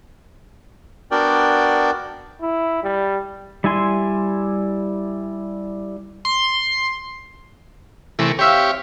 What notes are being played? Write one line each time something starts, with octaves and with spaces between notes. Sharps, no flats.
B3 D4 F#4 A#4 D5 G5
E4
G3
G3 E4 G#5 C6
C6
C3 E3 A3 A#4 C#6
C4 G4 C#5 E5 F5